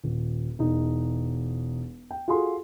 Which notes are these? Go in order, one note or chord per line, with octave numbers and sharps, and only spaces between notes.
D#1
E1 D#4
G5
F4 F#4 G#4 A4 C6